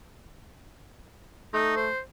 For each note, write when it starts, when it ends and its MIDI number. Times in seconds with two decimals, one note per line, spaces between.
1.53 1.88 57
1.53 1.76 63
1.76 2.00 72